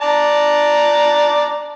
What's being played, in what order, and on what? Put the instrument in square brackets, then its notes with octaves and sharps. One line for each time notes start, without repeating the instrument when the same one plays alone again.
[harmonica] D5 A5 A#5